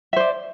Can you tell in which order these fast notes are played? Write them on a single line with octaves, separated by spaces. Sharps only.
E5 C5 D5